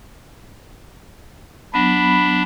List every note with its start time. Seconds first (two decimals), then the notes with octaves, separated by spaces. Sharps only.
1.74 F#3 B3 D4 B5